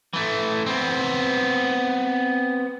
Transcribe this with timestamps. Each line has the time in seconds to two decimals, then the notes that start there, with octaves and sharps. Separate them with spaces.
0.13 E3 A3
0.66 B3 C4